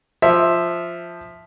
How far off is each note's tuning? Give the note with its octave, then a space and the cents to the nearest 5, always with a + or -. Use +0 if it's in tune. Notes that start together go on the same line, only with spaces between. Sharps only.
F3 +0 E5 +0